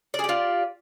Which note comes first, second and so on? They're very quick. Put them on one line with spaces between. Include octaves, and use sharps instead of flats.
D5 G#4 G4 F4